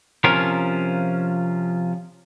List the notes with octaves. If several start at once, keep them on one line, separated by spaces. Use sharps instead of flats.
C3 F3 C#4 F4 A#4